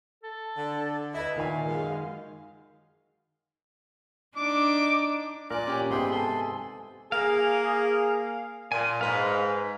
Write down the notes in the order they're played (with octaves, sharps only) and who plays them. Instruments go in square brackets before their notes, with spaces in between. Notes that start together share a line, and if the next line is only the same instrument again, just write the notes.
[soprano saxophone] A4
[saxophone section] D3
[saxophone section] E4 [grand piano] B4 D#5
[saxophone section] A#2 [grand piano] D#3 G#5 [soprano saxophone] F5
[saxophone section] F#2 G#3
[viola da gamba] D4 D#4 [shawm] D6
[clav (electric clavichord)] A#2 A#4 [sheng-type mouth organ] D5 D6 F#6 [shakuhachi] G#5
[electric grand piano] C#4 G4
[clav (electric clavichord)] G#2 C3 [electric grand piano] B3 D#6 [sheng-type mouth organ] G5 B5 C6
[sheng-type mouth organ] A4 C6
[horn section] A#3 G#4 [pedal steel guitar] F5
[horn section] A#2 [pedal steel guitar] G#5
[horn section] G#2 [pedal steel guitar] B4 F5